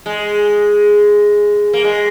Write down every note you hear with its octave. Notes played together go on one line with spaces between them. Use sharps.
G#3
A#3
G#3